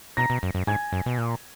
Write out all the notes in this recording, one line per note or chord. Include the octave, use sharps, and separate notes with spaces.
B2 A#5 A#6
B2
F#2
F#2
G#2 G#5 G#6
F#2
B2
A#2